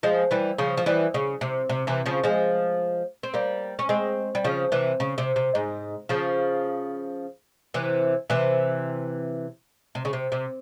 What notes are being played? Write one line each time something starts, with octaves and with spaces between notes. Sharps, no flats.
F3 G#3
E3 G3
C#3 F3
F3
E3 G3
C#3
C3
C3
C3 E3
C#3 F3
F3 G#3
C4
G3 A#3
C#4
G#3 C4
G3
C#3 F3
C3 E3
C#3
C3
C3
G#2
C#3 F3
C3 E3
C3 E3
C3
C#3
C3
C3